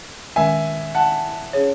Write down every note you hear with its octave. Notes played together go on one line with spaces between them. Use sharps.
D#3 G#3 C#4 E5 G#5
F#5 A5
C#4 G#4 C#5